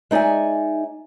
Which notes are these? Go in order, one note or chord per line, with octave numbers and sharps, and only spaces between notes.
G#3 D#4 D5 E5 G#5